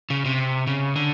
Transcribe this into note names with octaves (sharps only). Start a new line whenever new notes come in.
C#3
C3
C#3
D3